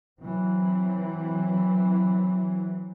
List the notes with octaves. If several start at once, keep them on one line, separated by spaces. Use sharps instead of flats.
E3 F#3 C4